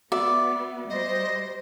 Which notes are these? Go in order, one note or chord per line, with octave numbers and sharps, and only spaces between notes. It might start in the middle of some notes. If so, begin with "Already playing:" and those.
B3 F#4 D5 E5
G3 C5 D#5